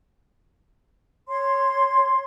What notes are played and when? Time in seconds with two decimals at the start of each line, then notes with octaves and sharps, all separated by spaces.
1.28 C#5 C6